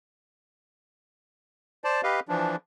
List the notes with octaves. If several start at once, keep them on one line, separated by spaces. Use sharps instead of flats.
C5 D5 A5
G4 B4 D#5 F5
E3 F3 D4